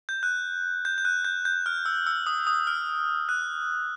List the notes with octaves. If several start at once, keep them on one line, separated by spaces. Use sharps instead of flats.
G6
F#6
G6
G6
F#6
G6
G6
F6
E6
E6
D#6
D#6
F6
F#6